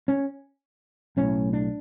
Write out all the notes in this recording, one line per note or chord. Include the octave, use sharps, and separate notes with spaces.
C#4
B1 A2 C#4
D4